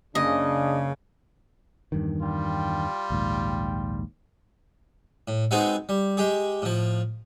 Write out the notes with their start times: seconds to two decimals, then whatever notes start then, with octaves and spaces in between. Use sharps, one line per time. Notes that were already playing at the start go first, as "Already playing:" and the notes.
0.15 F#1 C#3 D4 D#5
1.92 E2 G2 D#3
2.22 G3 F4 G5
3.10 A#1 D#2 G#2
5.28 A2
5.51 G#3 B3 C4 D#4 F#4 G#4
5.89 G3
6.17 G#3 G4 G#4
6.62 A2 F3